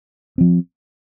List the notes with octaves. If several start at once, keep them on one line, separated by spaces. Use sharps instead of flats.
F3 C4